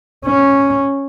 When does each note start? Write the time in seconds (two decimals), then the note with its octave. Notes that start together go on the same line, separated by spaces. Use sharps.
0.26 C#4